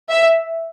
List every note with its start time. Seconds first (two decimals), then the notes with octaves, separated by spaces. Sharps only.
0.11 E5